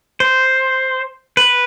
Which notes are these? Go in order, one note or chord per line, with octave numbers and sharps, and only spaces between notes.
C5
B4